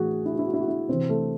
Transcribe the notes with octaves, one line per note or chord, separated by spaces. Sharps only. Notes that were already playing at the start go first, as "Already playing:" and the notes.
Already playing: A2 E3 F#4 G#4
E4
F#4
E4
F#4
E4
F#4
E4
C3 E3 C4
A3